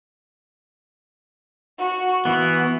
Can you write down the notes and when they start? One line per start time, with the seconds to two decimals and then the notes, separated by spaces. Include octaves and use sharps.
1.79 F#4 C#6
2.25 E3 B3 F#4